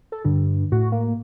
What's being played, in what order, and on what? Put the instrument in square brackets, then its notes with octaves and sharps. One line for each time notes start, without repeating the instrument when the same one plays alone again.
[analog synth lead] A4
[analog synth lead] G2 [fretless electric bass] D3
[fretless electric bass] A2 [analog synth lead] F#4
[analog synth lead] A#3